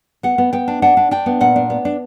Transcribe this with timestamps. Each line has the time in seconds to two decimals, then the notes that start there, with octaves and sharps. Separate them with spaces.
0.23 B3 F#5
0.38 B3
0.53 B3 G5
0.68 D4
0.82 D4 F#5
0.97 D4
1.11 D4 G5
1.26 B3
1.41 A#2 F#5
1.56 D4
1.70 B3
1.85 D4